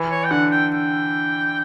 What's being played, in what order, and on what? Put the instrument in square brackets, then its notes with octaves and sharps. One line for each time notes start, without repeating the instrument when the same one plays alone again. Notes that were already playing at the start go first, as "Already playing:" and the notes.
Already playing: [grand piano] E3
[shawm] C#5
G5
[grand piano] D3 [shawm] F#5
[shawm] G5
G5